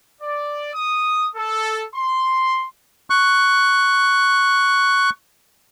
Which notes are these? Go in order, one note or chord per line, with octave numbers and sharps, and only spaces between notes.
D5
D#6
A4
C6
C#6 F#6